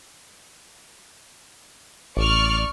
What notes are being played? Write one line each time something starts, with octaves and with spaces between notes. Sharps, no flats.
A1 D5 C#6 F6